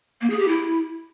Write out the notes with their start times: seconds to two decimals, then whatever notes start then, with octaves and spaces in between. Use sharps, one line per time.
0.21 A#3
0.30 G#4
0.39 G4
0.48 E4